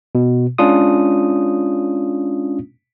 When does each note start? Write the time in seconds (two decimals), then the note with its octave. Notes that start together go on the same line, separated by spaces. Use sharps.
0.15 B2
0.58 G#3 C#4 D4 F4 D#6